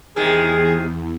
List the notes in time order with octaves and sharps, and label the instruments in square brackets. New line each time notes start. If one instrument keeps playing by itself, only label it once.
[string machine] E2 [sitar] C3 D#3 G#3 [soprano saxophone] G#4